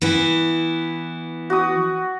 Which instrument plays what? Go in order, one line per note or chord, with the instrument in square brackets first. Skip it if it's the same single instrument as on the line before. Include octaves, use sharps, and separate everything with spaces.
[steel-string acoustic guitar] E3 B3 E4
[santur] F#4 D#6